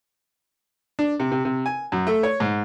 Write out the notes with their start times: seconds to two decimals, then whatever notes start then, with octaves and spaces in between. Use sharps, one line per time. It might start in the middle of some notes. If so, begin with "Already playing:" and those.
0.99 D4
1.20 C3
1.32 C3
1.45 C3
1.66 G#5
1.92 F#2
2.07 A3
2.23 C#5
2.40 G#2